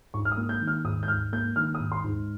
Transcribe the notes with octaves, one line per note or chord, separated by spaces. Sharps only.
G#2 C#6
F6
D#6
A#3
G6
D#3
F6
G#2 D#6
G6
G#2 F6
A#3 G6
D#3 F6
D#6
G#2
C6
G#2